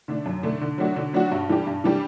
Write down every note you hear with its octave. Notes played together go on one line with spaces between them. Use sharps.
D3 A3 D4
F#2
D3 A3 D4
D3
F#3 A3 D4 F#4
D3
F#3 A3 D4 F#4
G2
E3 G3 D4 G4
G2
E3 G3 D4 G4